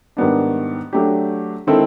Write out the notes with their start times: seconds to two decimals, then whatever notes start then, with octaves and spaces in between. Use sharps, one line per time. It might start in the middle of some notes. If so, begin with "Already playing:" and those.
0.17 G#2 D#3 G3 B3 D4
0.93 F#3 A3 D4 G4
1.67 D#3 G#3 C4 E4 A4